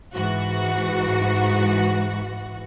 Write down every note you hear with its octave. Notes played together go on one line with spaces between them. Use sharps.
G#2 E3 F#4